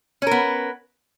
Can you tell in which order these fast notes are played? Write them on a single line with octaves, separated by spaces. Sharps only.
C#4 A#4 B3